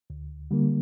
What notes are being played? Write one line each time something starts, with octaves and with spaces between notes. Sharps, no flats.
D2
D3 G3 A#3